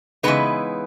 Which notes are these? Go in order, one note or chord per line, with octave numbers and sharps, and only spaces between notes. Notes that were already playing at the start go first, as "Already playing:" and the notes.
C#3 E3 G#3 B3 D#4 B4